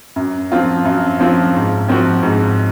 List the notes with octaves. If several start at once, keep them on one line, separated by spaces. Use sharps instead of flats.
F#2
F3 C4 F4
F#2
F3 C4 F4
G#2
F3 C4 F#4
G#2